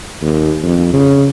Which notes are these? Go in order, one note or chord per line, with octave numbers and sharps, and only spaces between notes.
D#2
F2
C#3